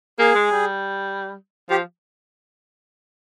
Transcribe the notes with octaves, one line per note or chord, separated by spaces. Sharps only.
A#3 G#4
G#3
G3
F3 G4